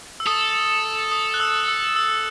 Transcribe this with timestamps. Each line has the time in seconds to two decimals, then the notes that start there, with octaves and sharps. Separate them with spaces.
0.20 E6
0.26 A4 D#6
1.12 D#6
1.34 F#6
1.40 E6
1.68 E6
1.96 E6